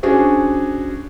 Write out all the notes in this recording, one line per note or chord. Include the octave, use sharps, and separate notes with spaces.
C#4 D4 F#4 G#4 C5